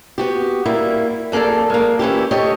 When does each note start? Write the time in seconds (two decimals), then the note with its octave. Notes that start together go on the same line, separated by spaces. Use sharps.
0.18 B3 F#4 G4
0.66 G3 A#3 E4
1.32 D#2 A#3 G#4 A4 D5
1.70 G#3 A#3
1.99 E3 C#4 E4 G4
2.31 A3 G4 C#5 D#5